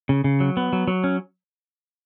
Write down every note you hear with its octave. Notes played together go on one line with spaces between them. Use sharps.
C#3
C#3
F#3
B3
F#3
F#3
C#4